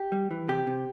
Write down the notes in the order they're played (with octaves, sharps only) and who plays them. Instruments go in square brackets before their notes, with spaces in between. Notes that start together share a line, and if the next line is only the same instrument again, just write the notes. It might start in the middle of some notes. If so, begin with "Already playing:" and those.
Already playing: [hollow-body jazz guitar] G4
G3
E3
C3 G4
C3